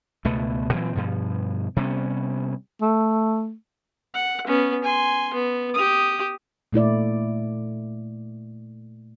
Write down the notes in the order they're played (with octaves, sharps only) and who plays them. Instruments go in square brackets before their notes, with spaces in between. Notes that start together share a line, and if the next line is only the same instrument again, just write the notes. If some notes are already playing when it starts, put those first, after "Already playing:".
[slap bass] C#2 B2 A3 B3
A#2 E3 F#3 C4
G2 B2 F3
C3 G3 B3 C#4
[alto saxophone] A3
[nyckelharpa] F#5
B3 C#4
G#5 C6
B3
G4 D#6
[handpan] A#2 A3 E4 D5